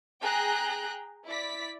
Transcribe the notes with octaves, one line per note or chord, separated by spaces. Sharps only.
G#4 G5 A#5 F#6
E4 D5 B6